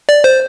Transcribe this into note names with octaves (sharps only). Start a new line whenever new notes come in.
D5
C5